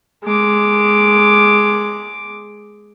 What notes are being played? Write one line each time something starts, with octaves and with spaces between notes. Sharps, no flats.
G#3 D6